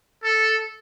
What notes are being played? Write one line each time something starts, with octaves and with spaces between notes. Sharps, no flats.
A4